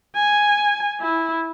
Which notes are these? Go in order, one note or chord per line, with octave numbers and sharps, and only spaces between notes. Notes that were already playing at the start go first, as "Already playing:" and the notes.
G#5
E4